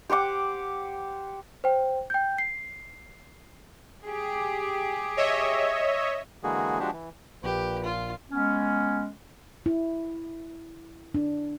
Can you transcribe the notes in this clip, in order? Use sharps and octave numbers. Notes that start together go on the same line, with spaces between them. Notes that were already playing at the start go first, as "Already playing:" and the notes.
G4 C5 F#5 D6
C5 G5
G5 G6
C7
G4 G#4
C#5 D#5 E5
D3 E3 G#3 A#3 F#4 G#4
F3 G#3 D4 F#4 G4
E3
A#1 A#2 G4 B4
F4
G#3 B3 C#4
E4
D4